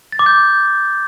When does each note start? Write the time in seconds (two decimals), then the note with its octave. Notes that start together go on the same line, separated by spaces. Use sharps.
0.12 A6
0.19 D6
0.26 G6